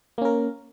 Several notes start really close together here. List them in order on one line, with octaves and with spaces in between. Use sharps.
A#3 C#4 A#4